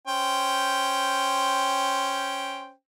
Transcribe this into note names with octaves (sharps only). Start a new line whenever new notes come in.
C#4 C5 G5